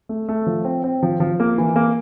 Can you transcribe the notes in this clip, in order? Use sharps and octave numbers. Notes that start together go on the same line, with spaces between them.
A3
A3
F3
C4
C4
F3
F3
A#3
E3
A#3